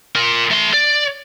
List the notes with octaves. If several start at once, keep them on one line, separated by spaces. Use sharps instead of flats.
F4 A#4
A3 C6
D5